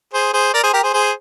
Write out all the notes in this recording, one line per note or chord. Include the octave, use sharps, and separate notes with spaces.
G#4 C5
G#4 C5
A#4 D5
G#4 C5
G4 A#4
G#4 C5
G#4 C5